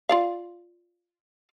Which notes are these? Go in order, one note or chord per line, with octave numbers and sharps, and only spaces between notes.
F4 D5 F5